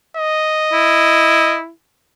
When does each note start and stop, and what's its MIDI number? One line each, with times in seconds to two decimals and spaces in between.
0.17 1.58 75
0.73 1.70 64